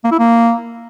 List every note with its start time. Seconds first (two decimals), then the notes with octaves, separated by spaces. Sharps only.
0.04 A#3
0.12 E4
0.19 A#3